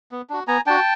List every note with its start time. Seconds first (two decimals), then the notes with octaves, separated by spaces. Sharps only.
0.12 B3
0.30 D4 F#4
0.48 B3 G#5 A#5
0.66 D4 F#4 G5 A5